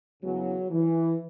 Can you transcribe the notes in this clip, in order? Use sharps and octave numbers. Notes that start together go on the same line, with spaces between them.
E2 C#3 E3 F#3
E3